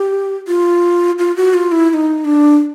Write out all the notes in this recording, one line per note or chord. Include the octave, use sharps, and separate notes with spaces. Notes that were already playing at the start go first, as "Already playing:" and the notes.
Already playing: G4
F4
F4
F#4
F4
E4
E4
D#4
D4